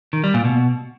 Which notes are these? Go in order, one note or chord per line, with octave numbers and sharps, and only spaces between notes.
D#3
G3
A#2
B2